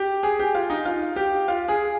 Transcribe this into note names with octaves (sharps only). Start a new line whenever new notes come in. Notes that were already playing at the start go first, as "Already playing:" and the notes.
Already playing: G4
G#4
G4
F4
D#4
F4
G4
F4
G#4